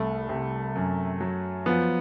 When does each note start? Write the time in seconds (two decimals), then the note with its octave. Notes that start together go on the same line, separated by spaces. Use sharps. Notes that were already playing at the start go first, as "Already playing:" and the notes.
Already playing: C2 A3
0.29 C3
0.75 F#2
1.21 F#3
1.66 F3 B3